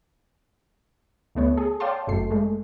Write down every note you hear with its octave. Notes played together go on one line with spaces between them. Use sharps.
D2 A3 B3 C#5
G#4 A4
C#5 D5 F5 G5 A5 C6
G1 F#2 A3 C7
G#3 A3